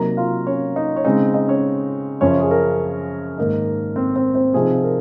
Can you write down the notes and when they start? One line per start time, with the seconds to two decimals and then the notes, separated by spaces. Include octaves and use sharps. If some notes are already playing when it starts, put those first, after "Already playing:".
Already playing: C3 F#3 A#3 D#4 A#4 A#5
0.17 F4 F5
0.47 C#4 C#5
0.76 D#4 D#5
0.96 C#5
1.04 C#3 G#3 C4 D#4 D#5
1.34 D#4 D#5
1.48 C#4 C#5
2.21 F#2 C#3 F3 C#4 C#5
2.40 G#4
2.51 A#4
3.37 G#2 D#3 A#3 D#4
3.96 C4 C5
4.16 C4 C5
4.35 C4 C5
4.54 C3 F3 C4 D#4 G#4
4.84 A#4